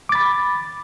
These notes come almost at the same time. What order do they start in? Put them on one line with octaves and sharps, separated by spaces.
D6 A6 B5